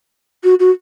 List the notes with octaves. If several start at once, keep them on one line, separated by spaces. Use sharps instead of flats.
F#4
F#4